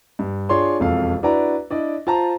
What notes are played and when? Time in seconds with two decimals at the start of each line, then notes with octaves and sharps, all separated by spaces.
0.19 G2
0.49 D4 F4 G#4 C#5 C6
0.80 E1 F2 A4 F5
1.23 D4 E4 F#4 B4 D5 A#5
1.70 D4 E4 D5 D#5
2.07 F4 C5 A5 A#5